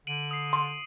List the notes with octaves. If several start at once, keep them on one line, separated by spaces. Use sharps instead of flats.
D3 D7 D#7 F#7
D#6 C7
C6